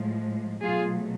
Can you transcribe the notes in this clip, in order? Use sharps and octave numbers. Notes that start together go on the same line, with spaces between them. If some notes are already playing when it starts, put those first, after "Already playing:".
Already playing: A2 F3 G#3
B2 F#3 A3 F4 G#4